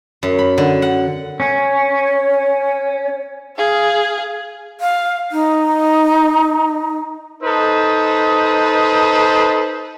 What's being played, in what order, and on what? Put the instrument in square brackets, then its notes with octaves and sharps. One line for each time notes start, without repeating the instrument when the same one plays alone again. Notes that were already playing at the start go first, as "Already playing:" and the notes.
[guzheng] F#2
B5
D3
F#5
[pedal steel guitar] C#4 [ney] C#5
[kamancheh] G#4 F5
[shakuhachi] F5
D#4
[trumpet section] D#4 A4 B4 C5 D#6